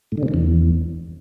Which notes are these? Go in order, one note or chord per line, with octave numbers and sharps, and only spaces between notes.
A2
D3
C3
D#3
E2